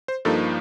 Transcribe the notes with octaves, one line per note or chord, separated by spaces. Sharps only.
C5
G2 F3 A#3 D#4 A4